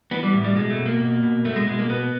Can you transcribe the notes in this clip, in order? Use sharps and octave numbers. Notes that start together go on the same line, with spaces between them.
E3 B3
G3
A2
G3
B2 G#3
A3
B2
A#3
B2
B2
B2 A3
G#3
B2 G#3
A#3
B2 B3